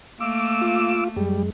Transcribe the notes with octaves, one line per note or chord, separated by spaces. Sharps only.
A3 A#3 D6 E6
F4
F#2 G3 G#3